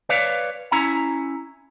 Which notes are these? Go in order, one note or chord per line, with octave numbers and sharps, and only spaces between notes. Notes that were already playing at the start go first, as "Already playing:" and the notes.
B4 C#5 D5 F5
C#4 E4 A#5